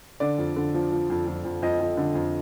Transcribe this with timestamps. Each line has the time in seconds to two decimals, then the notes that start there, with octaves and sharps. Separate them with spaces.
0.20 D3 D5
0.38 F2
0.56 D3
0.74 F3
0.92 F3
1.10 F2
1.27 F2
1.45 F2
1.62 F2 D#5
1.80 F2
1.97 D3
2.15 F2